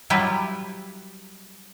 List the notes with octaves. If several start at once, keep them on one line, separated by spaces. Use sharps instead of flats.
F#3 G3 E4 F4 B4